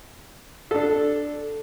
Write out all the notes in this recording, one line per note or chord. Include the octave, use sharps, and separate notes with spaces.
D4 A4